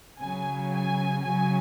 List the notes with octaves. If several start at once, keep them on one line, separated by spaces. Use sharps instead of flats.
C#3 F#3 G#5
G#5
C#3 F#3 G#5